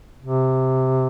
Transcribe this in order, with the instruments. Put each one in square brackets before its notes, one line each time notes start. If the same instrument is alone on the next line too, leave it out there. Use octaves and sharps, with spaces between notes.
[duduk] C3